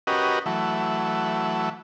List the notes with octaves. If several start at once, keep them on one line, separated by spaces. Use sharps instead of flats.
C#4 F#4 G4 A#4 B4 D#5
E3 F#3 A3